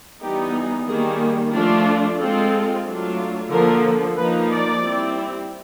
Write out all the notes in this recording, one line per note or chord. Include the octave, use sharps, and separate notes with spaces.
E3 G3 B3 D#4 G4
G#4
D#3 G3 A#3 G#4
F3 A3 D4 F4
G#3 C4 F4 A4
F#3 A3 D4 F4
D3 F3 A#3 A#4
F3 A#3 D#4 B4
D5
G3 C4 E4